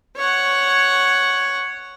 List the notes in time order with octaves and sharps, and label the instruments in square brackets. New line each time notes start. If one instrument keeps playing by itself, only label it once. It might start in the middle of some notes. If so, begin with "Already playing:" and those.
[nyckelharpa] C#5 F#5